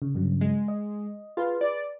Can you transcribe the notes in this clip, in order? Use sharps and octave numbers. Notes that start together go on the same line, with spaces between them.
C#3
G2 C#3 F#3
G#3
D#5
F4 G#4 B4
D5